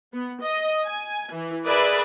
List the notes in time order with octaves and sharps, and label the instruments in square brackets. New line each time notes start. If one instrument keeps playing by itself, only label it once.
[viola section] B3
D#5
G#5
E3
G#4 A#4 B4 D5 E5